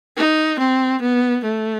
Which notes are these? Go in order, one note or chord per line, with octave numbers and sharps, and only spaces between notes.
D#4
C4
B3
A3